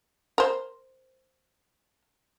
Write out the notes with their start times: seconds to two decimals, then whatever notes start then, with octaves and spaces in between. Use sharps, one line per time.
0.38 A#4 C5